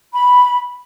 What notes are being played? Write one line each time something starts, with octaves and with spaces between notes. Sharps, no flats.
B5